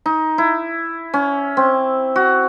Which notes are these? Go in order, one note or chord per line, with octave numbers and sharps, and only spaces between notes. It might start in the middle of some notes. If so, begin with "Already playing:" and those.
D#4
E4
C#4
C4
F#4